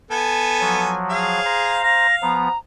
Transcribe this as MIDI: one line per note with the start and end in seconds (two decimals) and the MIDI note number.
0.11 0.96 59
0.11 0.96 69
0.11 0.96 80
0.61 1.39 53
0.61 1.39 54
1.10 1.80 68
1.10 1.80 77
1.45 2.07 72
1.45 2.07 82
1.84 2.37 77
1.84 2.16 94
2.22 2.48 53
2.22 2.48 59
2.22 2.57 82